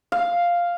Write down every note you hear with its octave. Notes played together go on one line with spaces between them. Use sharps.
F5